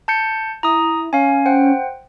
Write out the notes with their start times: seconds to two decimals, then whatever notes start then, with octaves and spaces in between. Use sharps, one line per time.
0.08 A5 G6 C#7
0.63 E4 A#5 D#6
1.13 C#4 F5 G#5
1.46 C5 F#5 G5